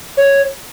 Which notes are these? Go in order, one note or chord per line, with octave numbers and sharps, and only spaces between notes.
C#5